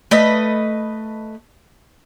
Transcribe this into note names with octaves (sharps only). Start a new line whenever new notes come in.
A3 B4 D#5